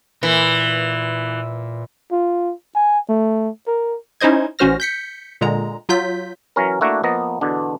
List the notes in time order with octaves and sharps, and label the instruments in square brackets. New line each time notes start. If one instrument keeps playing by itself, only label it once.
[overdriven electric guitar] A#2 A#4 [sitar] E3
[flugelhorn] F4
G#5
A3
A#4
[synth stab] C#4 D#4 E4 C5 D#5 G#6
A1 C#4 F#4 C5 F6 A#6
G6 B6 C#7
A#2 D3 G#3 A#5
F#3 F4 G6 B6
[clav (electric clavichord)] E3 F#3 C#4 A#4
A3 A#3 D4 E4 F#4
F3 A#3 B3 D#5
E2 B2 D3 D4